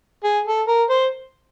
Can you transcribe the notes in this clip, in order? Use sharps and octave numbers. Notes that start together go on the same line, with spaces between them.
G#4
A4
A#4
C5